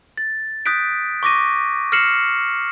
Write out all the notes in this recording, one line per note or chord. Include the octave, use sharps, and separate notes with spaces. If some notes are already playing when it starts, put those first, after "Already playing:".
A6
D#6 F#6 G6 B6 D7
C#6 D6 A#6 D#7
F6 A#6 C7 C#7 E7 F#7